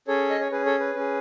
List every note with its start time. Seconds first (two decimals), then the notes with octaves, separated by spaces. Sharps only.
0.08 C#4 G#4 A4 C#5
0.30 D#5
0.41 C#5
0.51 C#4 G#4 B4
0.66 A4 C#5
0.80 B4
0.95 C#4 G#4